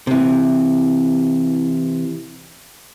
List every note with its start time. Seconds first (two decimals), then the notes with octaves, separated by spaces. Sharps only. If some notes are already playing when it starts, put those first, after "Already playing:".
0.07 C3 E3